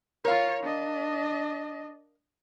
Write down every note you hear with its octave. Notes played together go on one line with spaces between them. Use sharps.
F4 A#4 C#5 F5
D4 D#5